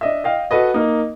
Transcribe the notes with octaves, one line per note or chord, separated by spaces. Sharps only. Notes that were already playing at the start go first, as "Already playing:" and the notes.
D4 D#5 E5
D#5 F5 G5
F#4 A4 B4 D#5
A#3 D#4